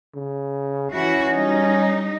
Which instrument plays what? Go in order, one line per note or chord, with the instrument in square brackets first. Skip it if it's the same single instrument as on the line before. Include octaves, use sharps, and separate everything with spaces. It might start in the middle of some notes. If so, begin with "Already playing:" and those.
[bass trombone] C#3
[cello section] E3 E4 F#4 [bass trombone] C#4
[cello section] G3 D#4